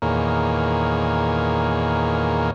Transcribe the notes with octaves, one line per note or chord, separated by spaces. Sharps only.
E2 A#2 D#3 A#3 G#4 C#5